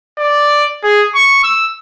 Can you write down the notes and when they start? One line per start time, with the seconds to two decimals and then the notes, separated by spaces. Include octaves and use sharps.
0.19 D5
0.84 G#4
1.15 C#6
1.44 E6